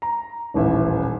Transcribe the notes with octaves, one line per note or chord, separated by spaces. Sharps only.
A#5
D#1 A1 E5